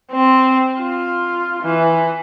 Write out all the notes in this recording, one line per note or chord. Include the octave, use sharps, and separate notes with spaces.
C4
F4
E3